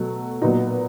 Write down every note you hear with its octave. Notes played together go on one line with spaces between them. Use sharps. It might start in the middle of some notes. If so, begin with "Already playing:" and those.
Already playing: B2 F#3 A3
A#2 F#3 B3 D#4